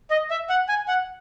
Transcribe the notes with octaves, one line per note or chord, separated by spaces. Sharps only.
D#5
E5
F#5
G#5
F#5